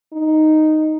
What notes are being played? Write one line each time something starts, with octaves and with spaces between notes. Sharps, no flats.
D#4